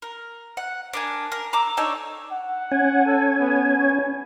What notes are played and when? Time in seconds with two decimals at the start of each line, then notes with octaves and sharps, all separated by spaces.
0.02 A#4
0.57 F#5
0.93 D4 A#4 G#5
1.32 A#4
1.53 A#5 D6 E6
1.77 D4 D#4 A4 C#5
2.31 F#5
2.72 C#4 G#5
3.06 A4
3.39 B3
3.78 C#5